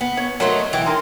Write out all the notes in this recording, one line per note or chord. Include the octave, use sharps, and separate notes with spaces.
B3
C#5
F#3 A3 D#4 A#4 C6
E3 G5
G3 D#4 A#4 C6